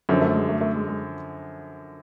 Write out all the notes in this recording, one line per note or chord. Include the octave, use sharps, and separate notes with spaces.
F#2 D3 F3 C#4
A3
G#3
A3
A3
G#3
G#3